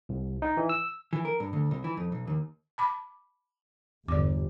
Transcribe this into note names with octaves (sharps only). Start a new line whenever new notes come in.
C2
D#4
E3
E6
E3
A#4
G2
D2
C2
E3
F2
B1
D#2
A5 B5 D6
G1 E2 D5 D6